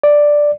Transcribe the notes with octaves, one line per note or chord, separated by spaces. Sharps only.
D5